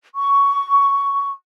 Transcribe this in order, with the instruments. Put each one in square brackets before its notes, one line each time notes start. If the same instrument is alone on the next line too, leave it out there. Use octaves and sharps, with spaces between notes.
[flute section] C#6